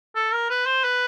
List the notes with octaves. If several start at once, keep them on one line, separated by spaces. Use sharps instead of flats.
A4
A#4
B4
C5
B4